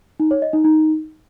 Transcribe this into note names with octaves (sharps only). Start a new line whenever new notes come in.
D#4
C#5
D#5
D#4
D#4